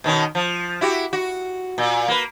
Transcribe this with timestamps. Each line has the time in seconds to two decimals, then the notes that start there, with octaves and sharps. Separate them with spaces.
0.04 B2 D#3 C#4
0.35 F3
0.81 E4 F#4 G4
1.13 F#4
1.78 A#2
2.08 A#3 B4